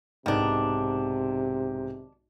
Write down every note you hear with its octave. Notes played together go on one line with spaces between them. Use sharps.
B1 G#2 C3 D#3 D4